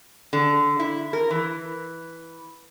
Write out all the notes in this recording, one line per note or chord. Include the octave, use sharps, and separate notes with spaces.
D3
E4
A#4
E3